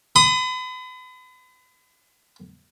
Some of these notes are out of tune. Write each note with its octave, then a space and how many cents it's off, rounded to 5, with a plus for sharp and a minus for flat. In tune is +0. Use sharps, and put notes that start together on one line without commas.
B5 +40 D#6 +0